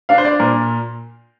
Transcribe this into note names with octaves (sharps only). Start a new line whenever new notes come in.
D4 F5
C5
D5
A#2 A#4